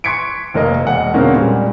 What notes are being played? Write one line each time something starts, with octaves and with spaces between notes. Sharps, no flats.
C6 C#6 G#6 B6 C#7 D7
F1 A#3 A#4 D#5
E1 F#5
B2 D3 G#3 A#3 C4 C#4
A#2 G3